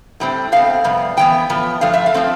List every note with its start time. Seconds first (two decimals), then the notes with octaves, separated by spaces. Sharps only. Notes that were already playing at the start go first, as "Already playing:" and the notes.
0.20 A2 G3 C4
0.52 B2 A3 C4 F5
0.84 F2 C3 G3 B3
1.17 A2 E3 B3 G5
1.50 A2 F3 B3
1.81 G2 F3 A3 F5
1.94 E5
2.06 F5
2.14 F3 A3 C4